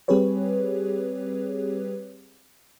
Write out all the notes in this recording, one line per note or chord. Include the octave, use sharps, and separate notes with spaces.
G3 C4 G4 G#4 B4 C#5